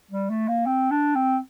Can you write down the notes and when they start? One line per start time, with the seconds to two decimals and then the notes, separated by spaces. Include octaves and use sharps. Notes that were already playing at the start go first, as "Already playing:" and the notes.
0.11 G3
0.30 A3
0.48 A#3
0.66 C4
0.91 D4
1.15 C4